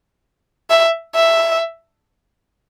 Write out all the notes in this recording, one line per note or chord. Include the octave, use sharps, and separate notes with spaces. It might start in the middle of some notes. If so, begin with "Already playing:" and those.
E5
E5